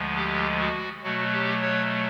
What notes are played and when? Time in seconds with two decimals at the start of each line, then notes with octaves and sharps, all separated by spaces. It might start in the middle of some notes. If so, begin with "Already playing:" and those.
Already playing: D2 D3 F3 G#3
0.16 G4
0.59 F#4
1.03 B2 F#3 A3 F#4
1.33 G4
1.62 C#5